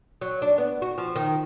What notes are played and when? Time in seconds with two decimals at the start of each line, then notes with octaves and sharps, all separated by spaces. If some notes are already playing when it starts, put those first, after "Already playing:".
0.21 F#3
0.42 D4
0.58 B3
0.82 F#4
0.98 F3
1.15 D#3